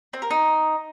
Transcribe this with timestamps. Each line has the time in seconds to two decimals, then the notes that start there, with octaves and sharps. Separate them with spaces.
0.13 C4
0.22 A#4
0.30 D#4